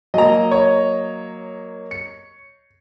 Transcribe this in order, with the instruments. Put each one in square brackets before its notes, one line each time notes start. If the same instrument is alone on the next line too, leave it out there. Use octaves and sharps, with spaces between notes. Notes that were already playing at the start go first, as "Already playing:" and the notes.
[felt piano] F#3 A#3 [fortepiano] D#5 A#5
[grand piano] C#5
[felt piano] C#7